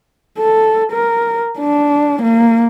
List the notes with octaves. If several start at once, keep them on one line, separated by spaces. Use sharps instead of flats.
A4
A#4
D4
A#3